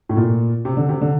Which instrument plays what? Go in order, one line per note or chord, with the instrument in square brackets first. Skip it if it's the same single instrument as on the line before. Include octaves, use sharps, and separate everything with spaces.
[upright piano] A2
A#2
C3
D3
C3
D3